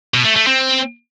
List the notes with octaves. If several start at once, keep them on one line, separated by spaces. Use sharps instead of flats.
B2
A3
A3
C4